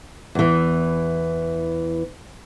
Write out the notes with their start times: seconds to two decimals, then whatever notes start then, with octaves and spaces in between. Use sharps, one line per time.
0.35 E2 E3